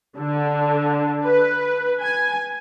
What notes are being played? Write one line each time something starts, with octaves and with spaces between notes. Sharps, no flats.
D3
B4
G#5